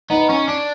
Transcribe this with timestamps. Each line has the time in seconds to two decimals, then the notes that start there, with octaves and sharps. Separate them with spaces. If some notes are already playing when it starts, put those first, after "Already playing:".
0.10 B3 D#4
0.29 C#4
0.48 D4